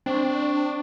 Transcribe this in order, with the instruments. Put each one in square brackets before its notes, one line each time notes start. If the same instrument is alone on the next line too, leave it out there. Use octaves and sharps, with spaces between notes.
[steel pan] C4 [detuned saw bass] D4 [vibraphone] G5 C#6